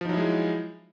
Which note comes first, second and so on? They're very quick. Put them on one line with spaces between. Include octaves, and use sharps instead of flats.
F3 D#4 F#3 E4 G#3